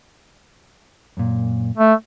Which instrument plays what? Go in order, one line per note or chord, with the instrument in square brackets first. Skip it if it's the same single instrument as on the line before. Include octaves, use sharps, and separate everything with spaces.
[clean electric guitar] F#2 A#2
[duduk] A3